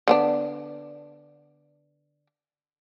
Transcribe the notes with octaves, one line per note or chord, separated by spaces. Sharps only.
D3 B3 D4